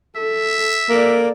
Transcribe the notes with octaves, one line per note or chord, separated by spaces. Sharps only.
A4 E5
A#3 A4 D5